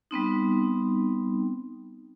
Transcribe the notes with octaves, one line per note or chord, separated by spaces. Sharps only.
G3 B3 C4 D#4